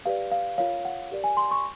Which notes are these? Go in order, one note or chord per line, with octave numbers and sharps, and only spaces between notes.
G4 B4 D5 F5
F5
F4 A#4 C#5 F5
F#5
G4 A#4 D5
G#5
C6
C#6